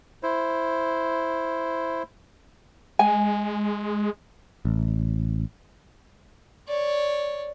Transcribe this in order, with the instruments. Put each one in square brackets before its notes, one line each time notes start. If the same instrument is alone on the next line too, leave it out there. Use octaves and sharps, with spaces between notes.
[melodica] E4 C5
[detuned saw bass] G#3 [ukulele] G#5
[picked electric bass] A1
[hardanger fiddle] C#5 D5